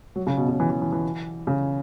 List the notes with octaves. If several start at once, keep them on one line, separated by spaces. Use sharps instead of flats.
F#3
C#3
B2
C#3
E3
E3
E3
E3
C#3